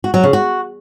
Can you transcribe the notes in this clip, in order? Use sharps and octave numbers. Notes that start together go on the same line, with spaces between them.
F#4
F#3
C#3
F#4